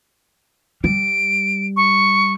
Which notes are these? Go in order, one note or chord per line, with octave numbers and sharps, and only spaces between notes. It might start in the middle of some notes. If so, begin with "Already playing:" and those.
G3 D7
C#6